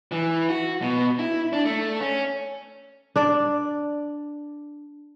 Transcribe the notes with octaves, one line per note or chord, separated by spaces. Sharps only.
E3
F#4
B2
E4
D4
A3
C#4
D4 D5